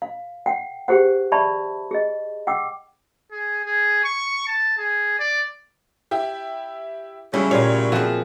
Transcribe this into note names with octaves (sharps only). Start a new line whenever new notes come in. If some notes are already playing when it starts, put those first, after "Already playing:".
F5
F#5 G5
G4 G#4 C5 F#5
D5 E5 A5 B5 C#6
G#4 D#5
F#5 G5 D6 E6
G#4
G#4
C#6
A5
G#4
D5
E4 G4
A2 C#3 F#3 G3 C#4 E4 G#4
A#2 G3 C#5 F5
F3 C4 F#4 G#4 E5